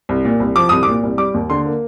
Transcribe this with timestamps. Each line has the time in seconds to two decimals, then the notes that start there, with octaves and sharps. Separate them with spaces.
0.09 C2
0.25 A#2
0.40 C2
0.56 F3 D6
0.69 C2 D#6
0.83 D6
0.88 A#2
1.03 C2
1.18 G3 D6
1.34 D#2
1.50 D3 C6
1.66 A#3